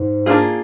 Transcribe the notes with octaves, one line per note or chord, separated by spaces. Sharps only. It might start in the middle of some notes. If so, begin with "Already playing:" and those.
Already playing: G#2
A#3 D4 F4 G#4